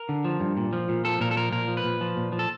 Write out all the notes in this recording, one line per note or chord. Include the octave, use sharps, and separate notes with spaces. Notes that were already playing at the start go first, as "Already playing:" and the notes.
Already playing: A#4
D3
F3
G2
A#2
F3
A#2
F3 A4
A#2 A#4
A4
F3 A#4
A#2 A#4
F3
B4
A#2
F3
A#2
F3
A4